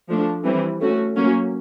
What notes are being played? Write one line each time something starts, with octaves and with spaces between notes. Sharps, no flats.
F3 A3 D4
E3 G3 C4
A3 C#4 F#4
F#3 A#3 C#4